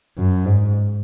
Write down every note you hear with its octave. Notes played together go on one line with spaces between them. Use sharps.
F#2
G#2